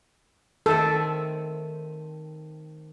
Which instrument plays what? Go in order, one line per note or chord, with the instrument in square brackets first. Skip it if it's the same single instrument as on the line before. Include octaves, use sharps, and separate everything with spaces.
[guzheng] D#3 A3 C4 [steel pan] A4